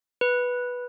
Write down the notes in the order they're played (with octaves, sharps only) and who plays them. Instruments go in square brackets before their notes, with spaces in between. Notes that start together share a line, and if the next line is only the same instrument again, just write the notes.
[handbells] B4